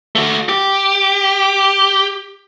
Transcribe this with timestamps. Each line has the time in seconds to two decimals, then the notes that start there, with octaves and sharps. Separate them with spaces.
0.15 A3 F#4
0.49 G4